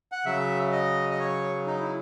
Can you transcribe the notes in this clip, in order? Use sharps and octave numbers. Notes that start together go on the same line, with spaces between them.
F#5
C#3 F#3 E5
D#5
D#5
C#5
D#4
E4